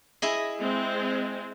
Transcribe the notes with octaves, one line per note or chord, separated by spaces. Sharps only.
E4 G#4 D#5
G#3 C4